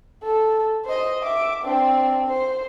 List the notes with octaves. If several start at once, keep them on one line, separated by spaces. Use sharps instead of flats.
A4
C5 D#5
E5 D6
C4 D4
C5